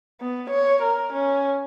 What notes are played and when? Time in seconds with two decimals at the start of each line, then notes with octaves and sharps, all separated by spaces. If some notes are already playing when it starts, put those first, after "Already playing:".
0.21 B3
0.50 C#5
0.82 A#4
1.13 C#4